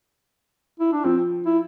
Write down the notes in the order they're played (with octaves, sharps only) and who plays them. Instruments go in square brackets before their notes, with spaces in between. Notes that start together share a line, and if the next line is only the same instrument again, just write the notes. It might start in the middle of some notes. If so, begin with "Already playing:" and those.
[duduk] E4
D4
[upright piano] F3 [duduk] C4
[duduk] E4